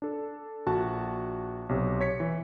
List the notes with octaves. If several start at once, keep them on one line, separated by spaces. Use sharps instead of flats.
D4 A4
A#1 F#4 A5
B1 C3
C#5 B6 C#7
E3